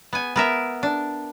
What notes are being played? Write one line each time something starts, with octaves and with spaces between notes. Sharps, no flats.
B3 G#5
B3 A#4 E5
D4